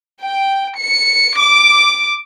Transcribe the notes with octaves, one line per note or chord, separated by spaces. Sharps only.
G5
C#7
D6